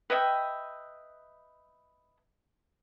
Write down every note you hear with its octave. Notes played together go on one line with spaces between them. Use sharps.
B4 D#5 E5 G5